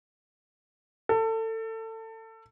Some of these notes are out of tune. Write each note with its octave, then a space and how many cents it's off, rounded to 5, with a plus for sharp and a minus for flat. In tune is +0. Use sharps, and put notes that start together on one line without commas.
A4 +25